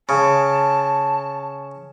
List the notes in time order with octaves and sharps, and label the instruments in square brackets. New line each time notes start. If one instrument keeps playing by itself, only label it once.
[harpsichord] C#3 [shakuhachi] A5